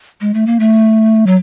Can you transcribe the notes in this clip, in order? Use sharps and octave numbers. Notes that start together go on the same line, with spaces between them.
G#3
A3
A#3
A3
F#3